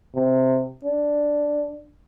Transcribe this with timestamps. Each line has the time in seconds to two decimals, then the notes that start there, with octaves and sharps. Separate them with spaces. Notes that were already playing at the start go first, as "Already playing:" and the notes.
0.15 C3
0.84 D4